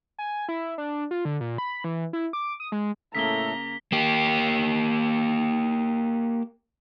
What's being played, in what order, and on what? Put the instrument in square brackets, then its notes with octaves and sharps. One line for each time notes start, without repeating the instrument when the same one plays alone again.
[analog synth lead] G#5
E4
D4
F4
D3
A#2
B5
E3
E4
D6
D#6
G#3
[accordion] A2 A3 A4 [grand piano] C#3 A#3 [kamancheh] A#5 [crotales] B6 G7
[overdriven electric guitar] A#3 G4